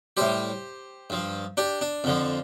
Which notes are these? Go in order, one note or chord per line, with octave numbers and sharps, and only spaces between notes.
A2 G3 G4 C5
G2 F3
D4 G4
D4
F2 D3 F3